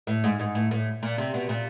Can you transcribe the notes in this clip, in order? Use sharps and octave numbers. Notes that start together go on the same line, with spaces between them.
A2
G#2
G#2
A2
A2
A#2
C3
B2
A#2